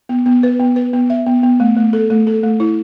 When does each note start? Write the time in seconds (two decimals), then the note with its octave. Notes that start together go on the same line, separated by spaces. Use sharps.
0.09 B3
0.26 B3
0.43 B4
0.60 B3
0.76 B4
0.93 B3
1.10 E5
1.26 B3
1.43 B3
1.60 A3
1.77 A3
1.93 A4
2.10 A3
2.27 A4
2.43 A3
2.60 E4